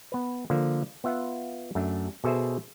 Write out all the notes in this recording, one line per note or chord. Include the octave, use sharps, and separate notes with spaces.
B3 B4
D3 F3 A#3
B3 F4 E5 F#5
F#2 A3 D4
B2 G#4 A4 C5 E5